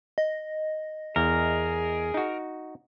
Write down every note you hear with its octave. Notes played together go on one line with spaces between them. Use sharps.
D#5
E2 G#4 A#4
D#4 F#4